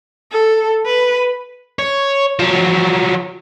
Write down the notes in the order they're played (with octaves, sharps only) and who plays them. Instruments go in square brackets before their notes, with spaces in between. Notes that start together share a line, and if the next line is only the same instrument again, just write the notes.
[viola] A4
B4
[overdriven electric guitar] C#5
F3 F#3